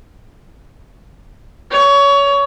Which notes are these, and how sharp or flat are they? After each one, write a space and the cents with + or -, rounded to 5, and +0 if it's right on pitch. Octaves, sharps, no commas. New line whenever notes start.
C#5 +25